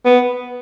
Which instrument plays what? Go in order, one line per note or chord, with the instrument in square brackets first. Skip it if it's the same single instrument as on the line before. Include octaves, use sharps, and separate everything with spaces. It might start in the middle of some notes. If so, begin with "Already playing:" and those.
[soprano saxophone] B3